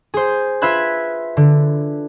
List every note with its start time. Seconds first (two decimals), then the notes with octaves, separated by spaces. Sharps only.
0.14 G#4 C5
0.62 F4 B4 E5 B5 F#6 G#6
1.37 D3